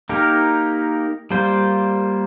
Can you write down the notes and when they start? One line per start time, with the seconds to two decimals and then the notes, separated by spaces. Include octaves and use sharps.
0.09 A#3 D#4 G4 A#4
1.31 G3 A#3 F4 C5